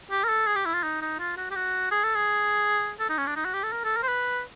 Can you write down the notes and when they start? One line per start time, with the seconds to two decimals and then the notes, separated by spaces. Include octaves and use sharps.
0.11 G4
0.24 A#4
0.29 A4
0.47 G#4
0.56 G4
0.66 E4
0.74 F4
0.83 D#4
1.01 D#4
1.19 F4
1.37 F#4
1.51 G4
1.56 F#4
1.91 G#4
2.04 A4
2.16 G#4
3.00 A4
3.09 D#4
3.18 C#4
3.27 D4
3.36 D#4
3.45 F#4
3.54 G4
3.64 A4
3.72 A#4
3.84 A4
3.97 A#4
4.03 C5
4.08 B4